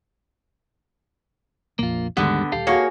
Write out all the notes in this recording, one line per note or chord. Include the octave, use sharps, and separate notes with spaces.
A#1 F2 A#3 F4
D#2 G#2 D3 G3 G#3 B3
D#1 G4 A4 F5
A#3 F#4 G#4 C#5